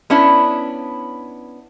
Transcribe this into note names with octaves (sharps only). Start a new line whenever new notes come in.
B3 C#4 D4 E4